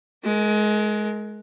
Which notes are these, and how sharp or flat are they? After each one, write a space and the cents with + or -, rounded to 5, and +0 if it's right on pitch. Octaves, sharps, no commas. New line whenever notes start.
G#3 +25 A#4 +0